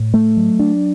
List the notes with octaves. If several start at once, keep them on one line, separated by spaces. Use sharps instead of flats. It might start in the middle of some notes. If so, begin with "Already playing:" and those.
Already playing: A2
A3
F#3
D4